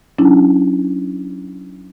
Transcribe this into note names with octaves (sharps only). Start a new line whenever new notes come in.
F#3 C#4 D4 E4